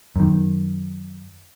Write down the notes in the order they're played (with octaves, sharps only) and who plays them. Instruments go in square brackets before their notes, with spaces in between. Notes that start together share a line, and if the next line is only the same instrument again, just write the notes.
[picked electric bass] F#2 D#3